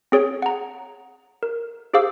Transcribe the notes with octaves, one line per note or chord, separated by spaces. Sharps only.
C4 G#4 C#5 D7
F#5 A#5
A#4
G4 G#4 C5 F5 D6 E6